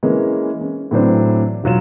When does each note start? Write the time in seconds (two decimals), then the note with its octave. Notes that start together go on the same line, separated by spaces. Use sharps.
0.03 E3 G#3 A#3 C#4
0.61 C#4
0.91 A2 E3 F#3 C4 D4 C5
1.64 E1 F#3 F4 E7